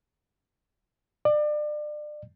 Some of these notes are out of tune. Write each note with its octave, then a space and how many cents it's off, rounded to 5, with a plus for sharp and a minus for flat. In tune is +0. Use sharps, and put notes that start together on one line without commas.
D5 +30